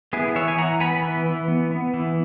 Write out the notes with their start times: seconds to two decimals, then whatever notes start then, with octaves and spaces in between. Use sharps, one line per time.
0.13 B3 E4 G#4
0.35 E3 C#5 E5
0.48 G#5
0.57 E3 F#5 A#5
0.80 B3 G#5 B5
1.03 E3
1.26 E3
1.48 B3
1.71 B3
1.94 E3